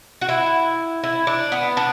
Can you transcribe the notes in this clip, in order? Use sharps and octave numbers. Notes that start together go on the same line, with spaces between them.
F#4
E4
E4
D4
B3
D4